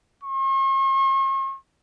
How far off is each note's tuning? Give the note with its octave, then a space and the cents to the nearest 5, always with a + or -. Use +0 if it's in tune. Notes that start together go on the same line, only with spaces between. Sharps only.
C#6 -45